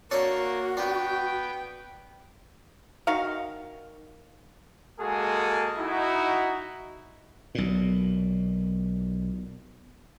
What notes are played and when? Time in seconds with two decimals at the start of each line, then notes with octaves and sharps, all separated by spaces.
0.11 A#3 D4 F#4 A4 C#5
0.77 B3 D4 G5
3.07 D#3 D#4 F#4 F5
4.99 G#3 A#3 F#4 G#4 A4 G#5
5.77 D#4 E4 F#4
7.55 B1 A#2